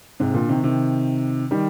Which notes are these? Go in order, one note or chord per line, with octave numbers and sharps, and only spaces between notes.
G#2 C3
A#2 D3
C3 D#3
C3 D#3
D#3 G3